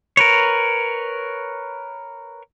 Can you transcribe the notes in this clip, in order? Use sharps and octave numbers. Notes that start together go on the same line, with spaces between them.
A#4 B4 C#5